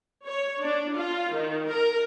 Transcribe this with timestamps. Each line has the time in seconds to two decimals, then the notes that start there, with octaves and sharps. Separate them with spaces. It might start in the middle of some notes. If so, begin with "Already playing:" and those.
0.25 C#5
0.62 D4
0.95 F4
1.34 D#3
1.69 A#4